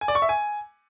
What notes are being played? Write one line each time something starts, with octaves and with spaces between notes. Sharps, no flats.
G#5
D5
C#6
E5
G#5